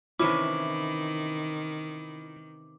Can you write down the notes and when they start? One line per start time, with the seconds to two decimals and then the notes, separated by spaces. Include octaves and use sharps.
0.19 C3 D#3 E3 C#4 E4 D6